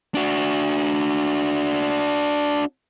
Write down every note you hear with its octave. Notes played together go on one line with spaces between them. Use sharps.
D4 F#4